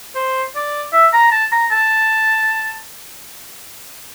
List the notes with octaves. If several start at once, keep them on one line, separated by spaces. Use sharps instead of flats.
C5
D5
E5
A#5
A5
A#5
A5